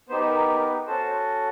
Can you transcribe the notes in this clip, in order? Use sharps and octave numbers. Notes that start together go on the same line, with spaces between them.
B3 D#4 G4 C5
A#4
A#4
B4
C#4 F#4 A4 C5